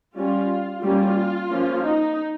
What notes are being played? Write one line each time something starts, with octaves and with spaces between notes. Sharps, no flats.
G3 C#4 F4
G3 A#3 C#4 F4
F3 A#3 C#4
D#4